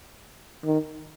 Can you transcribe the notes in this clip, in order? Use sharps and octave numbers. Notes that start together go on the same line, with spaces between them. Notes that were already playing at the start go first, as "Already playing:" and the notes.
D#3